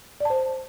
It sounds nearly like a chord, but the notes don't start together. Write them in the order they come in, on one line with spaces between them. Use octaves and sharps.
D5 A5 C5